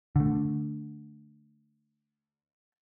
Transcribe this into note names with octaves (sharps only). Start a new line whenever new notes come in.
D3 A3